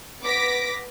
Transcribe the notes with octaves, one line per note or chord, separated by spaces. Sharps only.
B3 D6 A#6 B6 D7